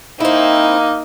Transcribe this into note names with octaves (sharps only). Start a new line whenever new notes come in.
A#3 C4 D#4 E4 F5